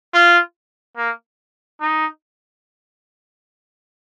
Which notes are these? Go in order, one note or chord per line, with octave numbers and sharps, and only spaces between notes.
F4
A#3
D#4